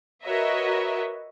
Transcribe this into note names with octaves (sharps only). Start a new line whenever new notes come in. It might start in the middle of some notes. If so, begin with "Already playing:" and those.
F#4 A#4 B4 C#5 D#5 E5